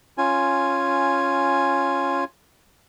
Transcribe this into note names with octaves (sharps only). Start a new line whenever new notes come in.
C#4 F4 G#5